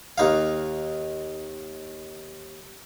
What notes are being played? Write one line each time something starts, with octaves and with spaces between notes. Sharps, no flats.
D#2 D#4 F5